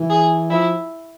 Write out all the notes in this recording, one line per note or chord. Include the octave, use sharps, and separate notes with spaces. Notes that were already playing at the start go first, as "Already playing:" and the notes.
Already playing: E3
G#4
F3 E4